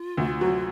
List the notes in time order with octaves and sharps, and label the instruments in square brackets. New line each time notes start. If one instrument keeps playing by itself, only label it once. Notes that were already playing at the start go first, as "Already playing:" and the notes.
Already playing: [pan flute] F4
[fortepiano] D2
F#3